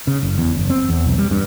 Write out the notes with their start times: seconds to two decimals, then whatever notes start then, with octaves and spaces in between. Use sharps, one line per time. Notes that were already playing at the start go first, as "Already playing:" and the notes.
0.07 C#3
0.23 F#1
0.38 E2
0.55 F#1
0.70 C4
0.89 E2
1.06 B1
1.18 G3
1.31 G2